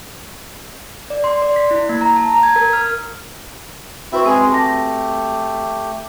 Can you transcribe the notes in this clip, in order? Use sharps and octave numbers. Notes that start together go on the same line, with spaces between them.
D5
C6
D5
B6
E4
A#3
A#5
A5
A#5
G#6
A#4
F6
C4 E4 F#4 B4 E5 C#6
G#3 C4 G#4
A3 G4 A5 A#6